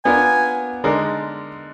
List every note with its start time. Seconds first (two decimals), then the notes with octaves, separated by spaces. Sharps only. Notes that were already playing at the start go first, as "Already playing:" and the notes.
0.05 B3 D4 F4 A#4 G#5
0.84 D3 G#3 D#4 A#4 D5